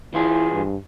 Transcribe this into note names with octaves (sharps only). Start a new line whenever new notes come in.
E3 E4 F4 G#4
G2